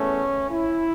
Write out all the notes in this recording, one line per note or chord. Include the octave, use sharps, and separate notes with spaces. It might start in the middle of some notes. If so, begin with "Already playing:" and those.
Already playing: E2 A3 C#4
E4